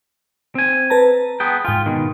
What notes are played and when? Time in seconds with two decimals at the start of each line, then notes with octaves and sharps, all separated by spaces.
0.55 C4 G#5
0.90 B4 A5 A#5
1.40 B3 G#4 G5
1.65 G#2 F4 G5 G#5
1.86 B2 D#3